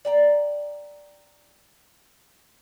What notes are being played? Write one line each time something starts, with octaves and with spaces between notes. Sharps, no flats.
D5 G5 A#5